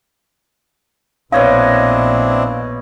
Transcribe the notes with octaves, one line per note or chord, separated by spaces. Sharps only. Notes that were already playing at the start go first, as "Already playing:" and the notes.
A#1 B2 C4 D4 E4 C#5 D#5 F5